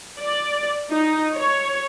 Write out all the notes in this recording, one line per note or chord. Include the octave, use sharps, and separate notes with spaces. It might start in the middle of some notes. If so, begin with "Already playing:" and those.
D5
D#4
C#5